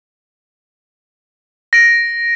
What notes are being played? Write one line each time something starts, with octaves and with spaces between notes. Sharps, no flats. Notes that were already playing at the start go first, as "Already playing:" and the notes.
A#6 D7